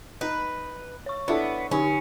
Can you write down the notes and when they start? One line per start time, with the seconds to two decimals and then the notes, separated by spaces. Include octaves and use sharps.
0.21 D#4 B4
1.06 C#5 C#6
1.28 B3 D4 E4 A4
1.71 D3 C#4 D#4 G4